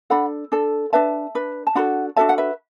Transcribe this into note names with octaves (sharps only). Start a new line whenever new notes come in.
D4 A4 F#5 B5
D4 A4
D4 B4 E5 A5
D4 B4
A5
D4 F#4 A4 F#5 B5
D4 F#4 A4 E5 A5
F#5
B4 E5